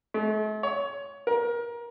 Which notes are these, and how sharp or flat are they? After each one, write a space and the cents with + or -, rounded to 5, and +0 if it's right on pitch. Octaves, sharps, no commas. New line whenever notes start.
A3 -45
C#5 +20
A#4 +25